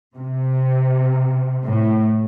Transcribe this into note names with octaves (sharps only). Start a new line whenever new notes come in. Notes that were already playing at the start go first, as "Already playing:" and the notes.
C3
A2